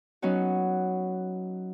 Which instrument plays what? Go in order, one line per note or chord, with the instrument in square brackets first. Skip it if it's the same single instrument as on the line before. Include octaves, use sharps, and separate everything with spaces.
[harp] F#3 B3 C#4 D#4 F#4